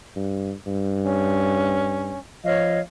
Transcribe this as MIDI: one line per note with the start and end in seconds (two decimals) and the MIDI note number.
0.16 0.53 43
0.67 2.14 43
1.03 2.19 61
2.44 2.80 53
2.44 2.79 73
2.44 2.79 75
2.44 2.79 77